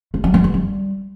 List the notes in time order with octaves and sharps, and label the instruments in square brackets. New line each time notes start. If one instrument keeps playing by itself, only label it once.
[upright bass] A3
F#3
E3
D3
G3